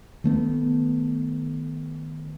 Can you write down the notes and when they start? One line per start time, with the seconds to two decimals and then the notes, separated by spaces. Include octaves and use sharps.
0.24 D#3 A3 B3